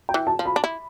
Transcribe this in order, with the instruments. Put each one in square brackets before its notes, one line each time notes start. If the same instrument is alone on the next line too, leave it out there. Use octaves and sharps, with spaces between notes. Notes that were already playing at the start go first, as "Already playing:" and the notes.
[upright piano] G5
[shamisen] E3
[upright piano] A5
[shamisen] F3
[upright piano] B5
[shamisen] D4
E4